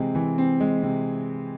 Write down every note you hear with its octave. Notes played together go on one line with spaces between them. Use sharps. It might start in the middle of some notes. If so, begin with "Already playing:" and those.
Already playing: C3 E3 G#3 C4
E3
C4
G#3
C3